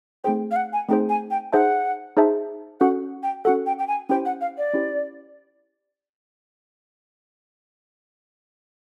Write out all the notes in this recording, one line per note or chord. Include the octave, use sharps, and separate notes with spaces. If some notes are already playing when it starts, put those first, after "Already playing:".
A3 C4 D#4 G#4 C5 G5
F5
F#5
G#5
A3 C4 D#4 G#4 C5 G5
G#5
G5
D#4 G#4 C5 E5 F#5 A5
D#4 G#4 C5 E5 A5
C#4 F#4 A4 F#5
G5
C#4 F#4 A4 F#5
G5
G5
G#5
C#4 E4 G4 C5 G5
F#5
F5
D5
C#4 E4 G4 C5